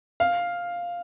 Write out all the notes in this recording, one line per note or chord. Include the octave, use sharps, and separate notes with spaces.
F5